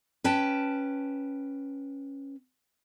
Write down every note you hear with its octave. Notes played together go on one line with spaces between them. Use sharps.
C#4 B4 G5 A5